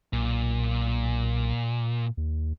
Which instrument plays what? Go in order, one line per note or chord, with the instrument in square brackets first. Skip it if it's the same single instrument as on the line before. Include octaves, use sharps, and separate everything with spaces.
[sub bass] B1 [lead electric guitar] A#2
[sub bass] D#2